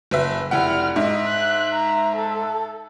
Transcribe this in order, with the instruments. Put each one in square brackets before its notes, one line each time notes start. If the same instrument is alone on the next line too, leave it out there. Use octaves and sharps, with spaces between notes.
[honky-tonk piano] F#1 B4 E5
[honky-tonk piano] F1 E4 F#5 [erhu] F6
[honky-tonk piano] G#2 [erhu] D#5 [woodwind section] E5
[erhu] F#6
A#5
A4